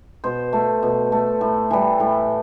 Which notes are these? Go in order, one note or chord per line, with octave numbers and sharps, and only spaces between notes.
B2 C5
A3
B2
A3
A2
E3 G3
A2